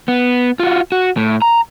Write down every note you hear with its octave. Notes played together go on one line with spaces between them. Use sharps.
B3
F4 F#4
F#4
A2
A#5